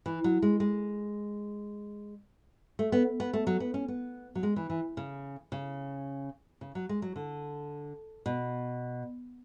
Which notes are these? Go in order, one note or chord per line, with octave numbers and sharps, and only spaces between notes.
E3
F#3
G#3
G#3
A3
B3
B3
A3
F#3
B3
C#4
B3
F#3
G#3
E3
E3
C#3
C#3
C#3
F#3
G#3
F#3
D3
B2